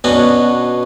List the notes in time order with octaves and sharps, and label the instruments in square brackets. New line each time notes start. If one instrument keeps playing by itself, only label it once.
[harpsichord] B2 B3 C#4 D4 F#4